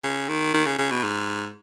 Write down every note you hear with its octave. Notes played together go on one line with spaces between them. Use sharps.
C#3
D#3
D#3
C#3
C#3
B2
G#2